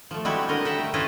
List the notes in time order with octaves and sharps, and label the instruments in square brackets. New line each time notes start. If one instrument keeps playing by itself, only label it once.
[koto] F3 A3
G3 G#3 C4 E4 F#4 G4
D3 A#4 D#5
G4 E5 F#5
A3
C#4 E4 F4 B4 D#5